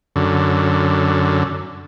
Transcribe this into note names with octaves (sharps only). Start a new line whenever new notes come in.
F#2 D3